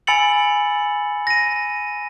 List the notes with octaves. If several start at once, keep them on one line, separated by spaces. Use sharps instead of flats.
G#5 B5 E6 A6 C#7 F#7
A#6 D#7